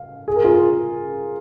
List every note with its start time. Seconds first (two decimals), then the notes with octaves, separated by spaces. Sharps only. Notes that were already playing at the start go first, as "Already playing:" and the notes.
Already playing: F5
0.28 G#4
0.36 A#4
0.44 F4 G#4